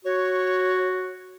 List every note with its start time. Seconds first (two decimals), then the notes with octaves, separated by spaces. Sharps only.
0.05 F#4 C#5